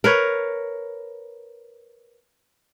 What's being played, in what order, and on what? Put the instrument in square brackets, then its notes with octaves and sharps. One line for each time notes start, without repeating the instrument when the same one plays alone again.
[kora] A#4 B4 C#5